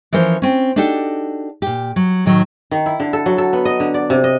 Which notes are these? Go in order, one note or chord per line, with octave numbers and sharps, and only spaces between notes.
E3 F3 C#4 A#4 C5
C4 C#4
D4 D#4 F#4 G4 A4
A#2 G4
F#3
A2 D#3 F#3 A3
D#3
E4
D3
A4
F#3
A4
B3
D#5
D3
D5
C3
D#5